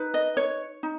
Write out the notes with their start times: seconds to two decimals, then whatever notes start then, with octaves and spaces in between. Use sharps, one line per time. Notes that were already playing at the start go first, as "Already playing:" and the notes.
Already playing: D#4 B4
0.14 D#5
0.37 C#5
0.83 D#4